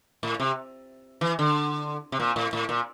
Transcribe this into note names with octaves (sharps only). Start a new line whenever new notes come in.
A2
C3
E3
D3
C3
A#2
A2
A2
A#2